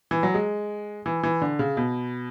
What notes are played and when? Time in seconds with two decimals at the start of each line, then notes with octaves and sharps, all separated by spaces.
0.11 E3
0.23 F#3
0.34 G#3
1.06 E3
1.23 E3
1.42 D3
1.59 C#3
1.77 B2